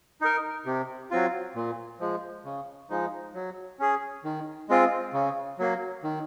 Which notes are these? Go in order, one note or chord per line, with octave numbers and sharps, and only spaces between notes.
D#4 A#4
C3
F#3 C4 F4
A#2
F3 G#3
C#3
F3 G#3 D#4
F#3
C#4 G#4
D#3
G#3 C4 F4
C#3
F#3 A#3
D#3